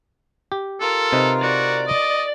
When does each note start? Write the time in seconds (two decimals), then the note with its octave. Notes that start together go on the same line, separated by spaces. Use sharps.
0.52 G4
0.81 F4 A4 A#4
1.12 C3 D#4 B4
1.43 F#4 D5
1.88 D#5 D6